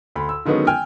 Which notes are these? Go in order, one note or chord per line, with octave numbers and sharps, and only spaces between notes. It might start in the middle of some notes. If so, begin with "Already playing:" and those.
D2 B5
E6
D3 D#3 F#3 G#3 B3 C#4
G5 G#5 F6